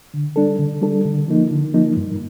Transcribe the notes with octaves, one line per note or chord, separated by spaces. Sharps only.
D3
G3 D4 A4
D3
G3 D4 A4
D3
F3 A#3 D#4
D3
F3 A#3 D#4
G2